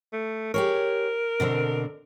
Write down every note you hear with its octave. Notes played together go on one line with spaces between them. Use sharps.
A3
G4 G#4 A#4 C#5
B2 D3 C4